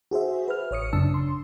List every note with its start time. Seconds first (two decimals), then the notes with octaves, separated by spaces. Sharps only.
0.11 F#4 G#4 C5 E5
0.48 B4 F6
0.71 A1 C#5 D#6 C#7
0.93 F#2 C#3 D4 A5 E6
1.14 C6